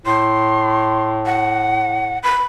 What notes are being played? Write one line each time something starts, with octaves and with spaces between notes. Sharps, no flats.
A2 C6
F#5
B5